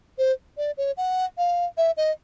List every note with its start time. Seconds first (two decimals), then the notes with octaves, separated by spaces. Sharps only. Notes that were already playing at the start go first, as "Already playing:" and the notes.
0.18 C5
0.57 D5
0.78 C#5
0.97 F#5
1.38 F5
1.77 E5
1.97 D#5